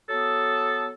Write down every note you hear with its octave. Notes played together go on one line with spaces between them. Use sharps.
F#3 B3 A4